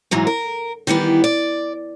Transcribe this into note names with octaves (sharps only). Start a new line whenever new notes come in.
G#2 E3 F#3 G#3
A#4
D#3 E3 G3 B3
D5